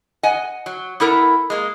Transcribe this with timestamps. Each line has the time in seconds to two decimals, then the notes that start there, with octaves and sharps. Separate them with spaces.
0.23 D#5 F#5 G#5
0.66 F#3
1.00 B3 E4 A4 A#4
1.50 G#3 A#3